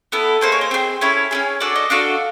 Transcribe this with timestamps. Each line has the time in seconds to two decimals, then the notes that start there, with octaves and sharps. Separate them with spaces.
0.12 B3 E4 A4
0.41 A#3 D#4 G#4 C5
0.52 C#5
0.61 C5
0.71 C4 F4 G#4
1.01 C#4 E4 A4 C#5
1.31 C#4 E4 G#4
1.60 D4 F#4 A4 D5
1.76 D#5
1.90 D4 F#4 A4 F5